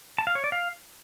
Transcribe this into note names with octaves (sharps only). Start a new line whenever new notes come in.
A5
F5
C#5
D5
F5